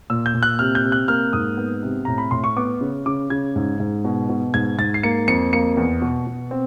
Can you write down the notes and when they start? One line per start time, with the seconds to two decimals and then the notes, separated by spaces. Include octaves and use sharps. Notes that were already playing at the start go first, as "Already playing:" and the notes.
0.10 A#2 E6
0.26 G6
0.34 A#2
0.43 F#6
0.59 C3 F6
0.75 G6
0.84 C3
0.92 F#6
1.08 A#3 F6
1.33 G#2 D#6
1.57 B3
1.83 C3
2.05 A2 A#5
2.18 B5
2.31 A2 C6
2.44 C#6
2.56 B3 D6
2.81 C#3
3.06 C#3 D6
3.30 C#3 G#6
3.56 G#2
3.80 G#2
4.04 B2
4.29 B2
4.54 G#2 G#6
4.78 G#2 A6
4.94 C7
5.03 A#3 C#7
5.27 F2 C#7
5.53 A#3 C#7
5.77 E2
6.01 B2
6.27 B2
6.51 C4